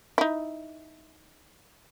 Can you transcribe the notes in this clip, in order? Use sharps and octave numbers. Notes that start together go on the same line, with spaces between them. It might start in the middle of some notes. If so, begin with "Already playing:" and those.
D#4 E4